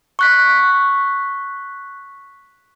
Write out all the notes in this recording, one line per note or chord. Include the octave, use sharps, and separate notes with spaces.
C#6 F#6 B6